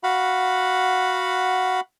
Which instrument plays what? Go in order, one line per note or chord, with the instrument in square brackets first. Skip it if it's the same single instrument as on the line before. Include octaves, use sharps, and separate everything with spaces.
[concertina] F#4 F5 F#5 B5